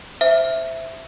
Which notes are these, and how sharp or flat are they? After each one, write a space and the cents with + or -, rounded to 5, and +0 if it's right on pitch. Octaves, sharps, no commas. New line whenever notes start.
C5 +0 E5 +0